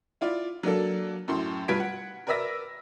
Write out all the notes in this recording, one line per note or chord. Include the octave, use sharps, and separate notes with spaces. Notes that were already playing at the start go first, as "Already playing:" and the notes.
E4 F4 D5
F#3 A#3 D4 A4
F#2 A2 C6
G2 F4 B4 G#6 B6 D7
F#5
A#4 B4 D5 E5 E6 A#6